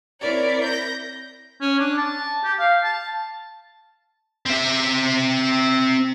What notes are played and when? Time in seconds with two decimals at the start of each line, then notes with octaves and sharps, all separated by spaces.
0.20 C4 E4 A#4 C#5 D5
0.63 G6 A#6
1.61 C#4
1.79 D4
1.98 A5
2.44 G4
2.59 F5
2.84 A5
4.46 C4 E5